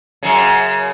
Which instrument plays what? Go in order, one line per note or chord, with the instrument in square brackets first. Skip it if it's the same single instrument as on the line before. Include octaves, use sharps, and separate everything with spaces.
[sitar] F#2 C#3